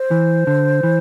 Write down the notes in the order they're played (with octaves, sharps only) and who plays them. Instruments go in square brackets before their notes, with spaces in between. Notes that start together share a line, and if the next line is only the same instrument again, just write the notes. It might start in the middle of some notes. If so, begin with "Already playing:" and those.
Already playing: [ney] C5
[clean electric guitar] E3
D3
E3